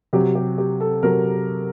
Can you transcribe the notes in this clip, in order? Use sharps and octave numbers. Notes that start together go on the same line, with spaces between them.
C3 F#3 G4
G4
G4
A4
C3 F#3 A#4